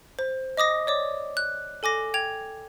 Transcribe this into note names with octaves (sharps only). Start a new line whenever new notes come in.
C5
D#5 D6 D#6 A#6
C#5 D5 D6
F#6
A4 G#5 D6 A#6
G5 G#6 F7